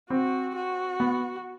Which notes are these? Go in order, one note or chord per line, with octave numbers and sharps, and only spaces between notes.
C4 F#4
F#4
B3